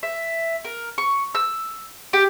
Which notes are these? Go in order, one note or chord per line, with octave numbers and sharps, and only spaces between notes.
E5
A#4
C#6
E6
G4